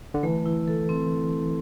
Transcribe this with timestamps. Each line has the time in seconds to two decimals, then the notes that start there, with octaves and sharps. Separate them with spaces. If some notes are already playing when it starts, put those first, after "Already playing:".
0.14 D3
0.23 E3 A3
0.46 E4
0.68 A4
0.89 C4